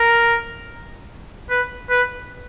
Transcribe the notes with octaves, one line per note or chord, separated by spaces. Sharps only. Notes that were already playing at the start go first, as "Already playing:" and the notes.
Already playing: A#4
B4
B4